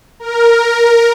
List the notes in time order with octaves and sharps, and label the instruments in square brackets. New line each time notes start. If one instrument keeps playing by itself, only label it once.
[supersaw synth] A#4